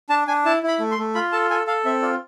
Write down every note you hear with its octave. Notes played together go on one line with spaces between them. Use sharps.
D4 A5
D4 G#5
E4 A5
E4 B5
A3
C6
A3
F4 B5
A4 A5
A4 G#5
A4 F5
C4 E5
F4 D5